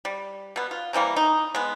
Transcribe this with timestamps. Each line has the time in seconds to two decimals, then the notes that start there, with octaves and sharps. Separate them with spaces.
0.05 G3
0.56 B2 B3
0.71 F4
0.93 C3 E3 G3 A#3
1.16 D#4
1.55 G#3 B3